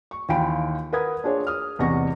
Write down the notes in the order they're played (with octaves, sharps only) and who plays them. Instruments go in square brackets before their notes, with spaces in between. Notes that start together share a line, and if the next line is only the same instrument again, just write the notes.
[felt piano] C#6
D#2 E3 F4 G5 B5 D7
A#4 B4 F#5 B5 D#6 G#6
D4 F4 G#4 C#5
D#6 F6
A1 E2 C3 B3 C#6 A#6